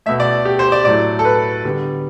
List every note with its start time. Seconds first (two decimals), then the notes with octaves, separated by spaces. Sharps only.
0.06 B2 A3 E5
0.20 D5
0.45 G4
0.59 C5
0.72 D5
0.85 A2 F#3 A3 D5
1.19 A4
1.25 B4
1.64 D3 G3 B3